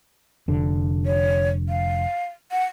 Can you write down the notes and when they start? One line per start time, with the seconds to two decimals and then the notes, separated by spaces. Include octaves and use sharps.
0.48 F1 D3
1.06 C#5
1.69 F5
2.51 F#5